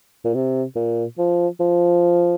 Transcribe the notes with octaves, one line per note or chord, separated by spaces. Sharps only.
A#2
C3
A#2
F3
F3